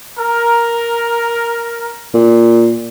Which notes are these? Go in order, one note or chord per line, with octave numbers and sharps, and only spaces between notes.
A#4
A#2